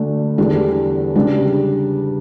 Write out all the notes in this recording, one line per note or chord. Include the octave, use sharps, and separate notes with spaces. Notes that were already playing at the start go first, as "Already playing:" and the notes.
Already playing: D2 D3 A3 D4
E2 D3 G3 D4
C#3 G3 D4